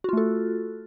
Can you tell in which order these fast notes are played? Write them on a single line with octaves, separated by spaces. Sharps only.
F#4 F4 A3 A4